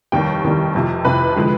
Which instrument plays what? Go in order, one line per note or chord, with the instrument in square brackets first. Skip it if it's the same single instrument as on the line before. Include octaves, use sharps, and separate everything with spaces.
[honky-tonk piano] F1 D#2 D#3 G3 G4 G5
F1 D#2 D#3 G3
F1 F2 C3
F1 F2 C3 B4 B5
D3 F3 G#3